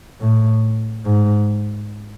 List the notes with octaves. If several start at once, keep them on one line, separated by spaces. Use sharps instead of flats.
A2
G#2